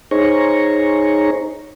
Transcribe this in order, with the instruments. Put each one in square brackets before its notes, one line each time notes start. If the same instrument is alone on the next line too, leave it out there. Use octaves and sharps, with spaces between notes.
[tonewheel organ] D#4 G#4 C5 C#5 A#5 C#6